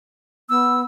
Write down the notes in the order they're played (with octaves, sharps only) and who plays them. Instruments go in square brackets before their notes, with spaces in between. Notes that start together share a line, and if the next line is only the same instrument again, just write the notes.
[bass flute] B3 [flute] E6